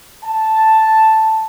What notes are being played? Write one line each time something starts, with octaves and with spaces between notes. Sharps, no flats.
A5